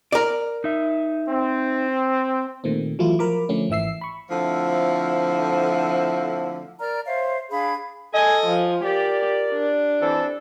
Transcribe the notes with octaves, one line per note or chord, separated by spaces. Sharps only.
A#4 D5
D#4 E5
C4
A#2 D#3 A3 C4
E3 F#3 A3 E4 F4
F3 A#4 B5 D6
D3 F3 A3 C#4
G#1 E3 E5 E6 C7
B5 C#6
D3 F3 A3 C4 E4
A#4 D5 A#5 F6
C5 C#5 E5 F5
D4 G#4 F5 B5
A4 D#5 G#5
F3
G4 A#4 D5
D4
E3 C4 A4